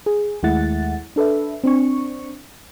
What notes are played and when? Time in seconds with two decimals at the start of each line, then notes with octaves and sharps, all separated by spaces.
0.06 G#4
0.43 D#2 G#3 A3 E4 F#5 A6
1.16 D4 A4 B4 E5
1.64 C4 D4 C#6